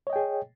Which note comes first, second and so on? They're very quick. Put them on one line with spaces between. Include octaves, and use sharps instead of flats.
C#5 D#5 G5 G#4